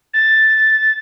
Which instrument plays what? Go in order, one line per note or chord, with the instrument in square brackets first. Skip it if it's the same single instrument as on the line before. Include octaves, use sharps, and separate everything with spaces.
[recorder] A6